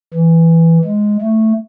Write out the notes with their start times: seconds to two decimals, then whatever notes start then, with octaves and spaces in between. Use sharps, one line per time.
0.14 E3
0.85 G#3
1.21 A3